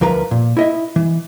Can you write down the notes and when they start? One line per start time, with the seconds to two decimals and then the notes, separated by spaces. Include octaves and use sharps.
0.01 D2 F3 A#4 B4 A#5
0.31 A#2
0.57 E4 D#5 E5
0.96 E3